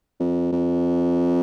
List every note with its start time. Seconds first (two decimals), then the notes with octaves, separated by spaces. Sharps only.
0.20 F2
0.52 F2